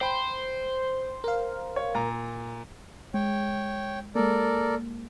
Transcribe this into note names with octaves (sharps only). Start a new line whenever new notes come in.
C5 G5 B5
A#4 F5
C#5
A#2 A#5
G#3 C#5 G5
G#3 A#3 A4 A#4 D5